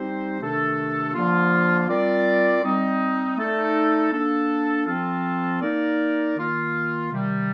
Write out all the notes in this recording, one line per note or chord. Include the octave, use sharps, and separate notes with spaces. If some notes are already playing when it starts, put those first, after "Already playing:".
Already playing: G3 C4 D#4 G4 C5
C3 D#3 A3 D4 A4
D3 F3 A#3 F4
G3 C4 F4 A#4 D5
G3 C4 D#4
A3 D#4 A4 D5
A#3 D4 A4
F3 C4 F4 A4
A#3 D#4 A#4 D5
D#3 A#3 F4
C3 D#3 G3